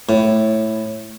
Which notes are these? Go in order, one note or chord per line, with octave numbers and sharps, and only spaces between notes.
A2